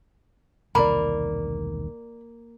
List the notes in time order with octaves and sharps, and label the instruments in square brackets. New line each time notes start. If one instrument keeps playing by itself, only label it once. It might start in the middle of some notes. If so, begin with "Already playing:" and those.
[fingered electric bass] E1 C2 D#3 [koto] A#3 [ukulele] D5 B5